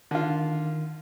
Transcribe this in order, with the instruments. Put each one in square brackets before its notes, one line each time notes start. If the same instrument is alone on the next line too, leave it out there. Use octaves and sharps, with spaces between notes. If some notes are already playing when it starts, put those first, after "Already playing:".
[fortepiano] D3 F4 [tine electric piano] D#3